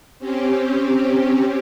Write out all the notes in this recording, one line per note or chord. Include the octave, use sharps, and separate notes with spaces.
C4 C#4 G4